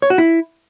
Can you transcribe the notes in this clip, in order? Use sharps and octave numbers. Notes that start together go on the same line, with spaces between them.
C#5
F#4
E4